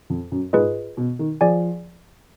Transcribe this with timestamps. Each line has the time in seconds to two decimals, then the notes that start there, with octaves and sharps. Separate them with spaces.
0.10 F2
0.32 F#2
0.53 G#2 F4 G#4 B4 D#5
0.97 B2
1.19 D#3
1.41 F3 G#4 D5 G#5